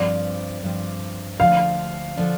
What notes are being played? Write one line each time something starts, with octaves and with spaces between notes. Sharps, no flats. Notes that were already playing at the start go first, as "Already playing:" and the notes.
Already playing: G2 F3 C4 D5
G2 F3 C4
D2 D3 F3 D4 F5
D3 F3 D4